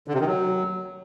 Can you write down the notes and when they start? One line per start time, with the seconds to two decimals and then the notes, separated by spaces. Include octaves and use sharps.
0.08 D3
0.14 C3
0.20 D#3
0.27 F#3